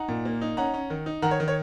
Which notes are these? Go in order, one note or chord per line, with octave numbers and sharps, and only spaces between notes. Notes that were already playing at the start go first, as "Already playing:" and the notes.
Already playing: D#4 F#5 A#5
A#2
A#3
D#4
C#4 F#5 A#5
C#4
D#3
D#4
D#3 F#5 A#5
C#5
D#3
C#5